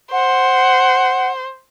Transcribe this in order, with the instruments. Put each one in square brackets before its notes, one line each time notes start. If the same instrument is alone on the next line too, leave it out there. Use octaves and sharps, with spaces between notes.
[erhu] C5 [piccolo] F#5